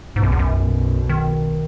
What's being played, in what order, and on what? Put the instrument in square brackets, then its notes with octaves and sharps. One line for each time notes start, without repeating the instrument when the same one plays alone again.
[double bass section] B1 B2 [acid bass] G#2
[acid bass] F#2
E2
F#2
[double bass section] B1 B2
[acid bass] D#3